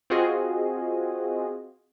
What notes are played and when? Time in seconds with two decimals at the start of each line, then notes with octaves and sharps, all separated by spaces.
0.10 C4 F4 F#4 G#4 D#5